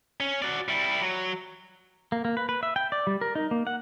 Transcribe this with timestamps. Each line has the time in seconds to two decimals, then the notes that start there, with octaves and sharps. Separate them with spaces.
0.20 C#4
0.42 F#4 D5
0.68 G3 E4
1.02 F#3
2.12 A#3
2.25 A#3
2.37 B4
2.49 B4
2.63 E5
2.76 G5
2.92 D5
3.07 G3
3.21 A#4
3.35 D#4
3.51 A#3
3.67 F#5